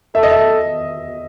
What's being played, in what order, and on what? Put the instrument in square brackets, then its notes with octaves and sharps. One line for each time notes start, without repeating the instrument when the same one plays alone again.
[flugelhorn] A4 [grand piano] E5
[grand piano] D#5
E5